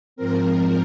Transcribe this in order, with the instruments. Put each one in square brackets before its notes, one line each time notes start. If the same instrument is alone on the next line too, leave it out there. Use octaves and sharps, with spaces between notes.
[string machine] G#2 F3 C4 A#4